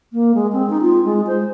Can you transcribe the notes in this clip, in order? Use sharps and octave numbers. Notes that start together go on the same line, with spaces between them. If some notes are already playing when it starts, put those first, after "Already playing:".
A#3
G#3
C4
D#4
F4
G#3
C5